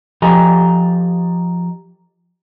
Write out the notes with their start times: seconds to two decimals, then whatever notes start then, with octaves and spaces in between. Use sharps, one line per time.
0.22 F3 G4 A4 D#5 G#5 A#5